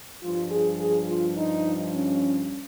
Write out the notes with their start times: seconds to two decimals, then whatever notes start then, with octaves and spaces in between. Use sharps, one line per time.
0.22 G2 F3 F4
0.51 G#4
0.79 G#4
1.07 F4
1.36 D#4
1.93 C#4